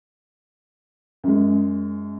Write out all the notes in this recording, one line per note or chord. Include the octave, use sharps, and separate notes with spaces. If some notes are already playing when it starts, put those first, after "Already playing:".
F#2 G#3